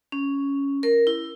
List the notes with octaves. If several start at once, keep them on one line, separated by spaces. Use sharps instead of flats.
C#4
A#4
E4